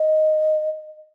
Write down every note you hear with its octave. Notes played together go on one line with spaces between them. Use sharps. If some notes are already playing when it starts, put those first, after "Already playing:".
Already playing: D#5